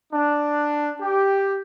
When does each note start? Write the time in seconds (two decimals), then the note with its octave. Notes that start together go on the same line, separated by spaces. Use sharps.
0.12 D4
1.00 G4